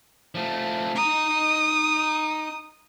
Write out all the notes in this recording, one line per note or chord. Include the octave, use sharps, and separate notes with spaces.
F3 A3
D#4 A#5 D#6